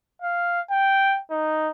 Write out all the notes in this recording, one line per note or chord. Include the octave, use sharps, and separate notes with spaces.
F5
G5
D#4